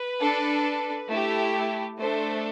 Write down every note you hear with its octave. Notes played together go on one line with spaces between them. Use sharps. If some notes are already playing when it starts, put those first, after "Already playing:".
Already playing: B4
D4 A4
A3 E4 G4
A3 D4 A4 C5